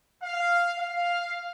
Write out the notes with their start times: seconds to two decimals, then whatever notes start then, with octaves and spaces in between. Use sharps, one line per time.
0.23 F5
0.78 F5